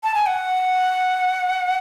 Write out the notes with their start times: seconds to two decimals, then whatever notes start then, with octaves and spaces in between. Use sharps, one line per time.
0.03 A5
0.14 G#5
0.26 F#5